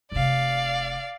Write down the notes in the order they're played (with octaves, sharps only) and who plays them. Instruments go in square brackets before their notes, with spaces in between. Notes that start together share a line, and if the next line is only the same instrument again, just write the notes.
[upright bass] F1 C3 [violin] D5 F5